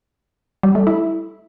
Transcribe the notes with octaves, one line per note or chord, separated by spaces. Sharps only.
G3
A3
E4